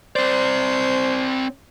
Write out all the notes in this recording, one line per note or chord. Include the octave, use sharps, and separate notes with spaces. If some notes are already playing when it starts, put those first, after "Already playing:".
C4 C5 D5